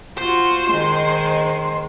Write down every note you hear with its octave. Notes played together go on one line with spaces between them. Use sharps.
F4 F#4 C5
D#3 G#3